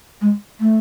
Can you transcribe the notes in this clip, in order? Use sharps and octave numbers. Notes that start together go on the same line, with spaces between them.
G#3
A3